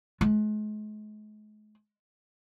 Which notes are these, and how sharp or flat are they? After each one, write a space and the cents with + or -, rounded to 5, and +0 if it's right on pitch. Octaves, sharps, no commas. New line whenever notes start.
G#3 +40